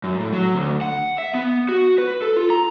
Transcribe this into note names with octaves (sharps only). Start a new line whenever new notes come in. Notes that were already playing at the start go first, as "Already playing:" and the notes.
F#2
A2
F#3
D2
F#5
E5
B3
F#4
B4
A4
F4
A#5